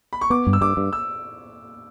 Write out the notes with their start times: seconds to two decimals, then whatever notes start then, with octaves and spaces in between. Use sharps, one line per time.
0.13 B5
0.21 C#6
0.30 B3 D6
0.47 G2
0.53 E6
0.61 G2 D6
0.77 G2
0.93 E6